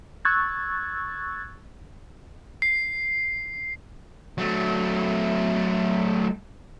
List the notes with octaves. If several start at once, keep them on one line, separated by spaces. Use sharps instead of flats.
C#6 E6 F#6 G#6 A6
C7
F#3 A3